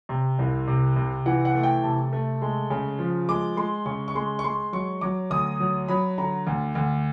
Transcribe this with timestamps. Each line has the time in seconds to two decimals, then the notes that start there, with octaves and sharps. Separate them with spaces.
0.09 C3
0.39 C2
0.68 C3
0.96 C3
1.26 E3 F#5
1.45 F#5
1.55 A3
1.63 G5
1.83 C3 A5
2.13 A3
2.42 G#3
2.70 C#3
2.99 F3
3.29 G#3 D6
3.57 G#3 C6
3.86 C#3 C#6
4.08 C#6
4.15 G#3 C6
4.39 C#6
4.44 G#3 C6
4.73 F#3 C#6
5.01 F#3 D6
5.30 D2 D#6
5.60 F#3
5.88 F#3 B5
6.18 D3 A#5
6.47 D2
6.75 D2